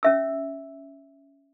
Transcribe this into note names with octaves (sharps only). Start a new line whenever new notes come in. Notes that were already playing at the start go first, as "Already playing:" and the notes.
C#4 E5 E6